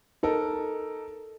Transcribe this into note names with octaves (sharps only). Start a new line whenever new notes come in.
D#4 A4 A#4